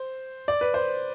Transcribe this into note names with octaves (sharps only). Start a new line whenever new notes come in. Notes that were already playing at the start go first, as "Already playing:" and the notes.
Already playing: C5
D5
B4
C5